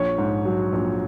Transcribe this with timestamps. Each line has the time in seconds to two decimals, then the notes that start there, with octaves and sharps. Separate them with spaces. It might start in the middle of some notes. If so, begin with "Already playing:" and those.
Already playing: A#1 C#5
0.18 G#2
0.45 F#3
0.73 A#1